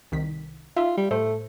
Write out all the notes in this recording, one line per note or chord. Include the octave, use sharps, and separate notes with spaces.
C2 D#3 B6
D#4 F4 E5
G3
A2 A3 C5